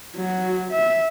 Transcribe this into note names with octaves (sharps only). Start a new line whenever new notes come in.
F#3 F#4
E5